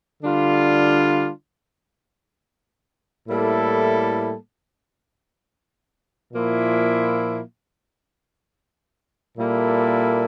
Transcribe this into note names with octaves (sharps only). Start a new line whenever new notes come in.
D3 G3 D4 F4
A2 G3 A#3 E4 A4
A#2 F3 A#3 E4
A#2 G3 A#3 E4 A4